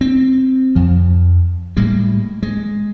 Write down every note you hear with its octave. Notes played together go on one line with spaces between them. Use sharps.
C4
F2 F3
A2 G3 G#3 A#3
G#3